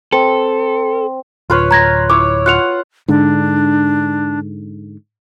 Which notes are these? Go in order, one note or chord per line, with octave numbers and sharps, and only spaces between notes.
C4 A4
D1 F4 B4 C#5
A#5 G#6 A#6
E4 C#5 D6
F4 F#5 F#6 C#7 F7
G#2 D3 D4